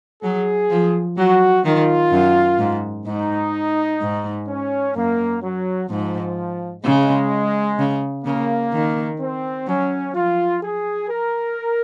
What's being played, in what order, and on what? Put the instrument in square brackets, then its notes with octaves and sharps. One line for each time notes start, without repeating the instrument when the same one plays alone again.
[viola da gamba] F#3 [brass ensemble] G#4
[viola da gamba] F3
[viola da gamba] F#3 [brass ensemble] F#4
[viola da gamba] D#3 [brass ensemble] F4
[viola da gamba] F#2
G#2
[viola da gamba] G#2 [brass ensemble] D#4
[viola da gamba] G#2
[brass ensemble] C#4
[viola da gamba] F#2 [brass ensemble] A#3
[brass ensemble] F#3
[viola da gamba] G#2 [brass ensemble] F3
[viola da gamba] C#3 [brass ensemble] G#3
[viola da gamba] C#3
[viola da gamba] C#3 [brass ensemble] A#3
[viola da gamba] D#3
[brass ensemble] C4
[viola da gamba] F#3 [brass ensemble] C#4
[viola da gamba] F3 [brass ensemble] F4
[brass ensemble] G#4
A#4